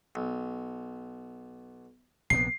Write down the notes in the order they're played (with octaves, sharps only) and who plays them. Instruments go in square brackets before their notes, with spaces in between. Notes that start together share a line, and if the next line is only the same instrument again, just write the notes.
[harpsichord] B1
[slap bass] A#1 C3 B3 [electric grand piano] C7